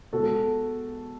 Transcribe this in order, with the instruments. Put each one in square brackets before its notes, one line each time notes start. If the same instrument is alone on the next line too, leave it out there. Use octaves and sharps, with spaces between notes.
[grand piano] B2 G#3 F#4 A4